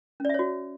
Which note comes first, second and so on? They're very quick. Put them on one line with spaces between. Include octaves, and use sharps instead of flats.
C#4 D5 E5 C#5 F#4